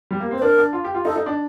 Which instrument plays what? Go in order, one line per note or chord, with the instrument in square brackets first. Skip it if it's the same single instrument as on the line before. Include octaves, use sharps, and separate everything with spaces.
[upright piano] G3
A#3
C4
[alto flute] C5
[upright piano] D4 [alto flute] A#4
[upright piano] D4
F4
G4
F4
[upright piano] D#4 [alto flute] A4
[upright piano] D#4
D4